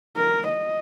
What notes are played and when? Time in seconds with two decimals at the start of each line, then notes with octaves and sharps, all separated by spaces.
0.17 A#4
0.49 D#5